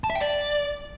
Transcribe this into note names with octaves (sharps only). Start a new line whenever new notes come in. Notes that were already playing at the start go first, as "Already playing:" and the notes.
A5
E5
G5
D5